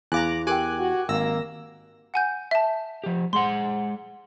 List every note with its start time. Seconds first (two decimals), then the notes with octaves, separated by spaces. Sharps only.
0.12 E2 F5 G#5 A#5 D6 F#6
0.47 G4 A#4 G5 G#5 D6 F#6
0.79 F#4
1.09 G#1 A#3 E6 A#6
2.14 F#5 G#5 G6
2.51 E5 A5
3.04 F3 G4
3.33 G#3 G#4 F#5 C6